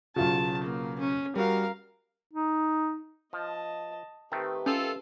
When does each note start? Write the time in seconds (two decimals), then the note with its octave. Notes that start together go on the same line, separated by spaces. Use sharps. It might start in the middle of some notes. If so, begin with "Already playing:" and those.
0.16 B1 C#3 F4 F#4 A5
0.64 A#3
1.00 C#4
1.36 G3 F#4 A#4 F5
2.33 D#4
3.33 F3 D#5 A5
4.32 D#3 A3 C4 G4 B4
4.66 C#4 F4 A4